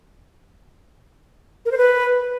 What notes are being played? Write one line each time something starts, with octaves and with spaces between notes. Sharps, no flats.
A#4
C5
B4